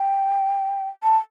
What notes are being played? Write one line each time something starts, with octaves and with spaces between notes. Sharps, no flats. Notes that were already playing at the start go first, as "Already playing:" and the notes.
Already playing: G5
A5